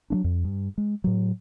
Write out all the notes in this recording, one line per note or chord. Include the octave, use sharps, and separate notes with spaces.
F#3 A3 D4
F2
G2
G#3
A2 F#3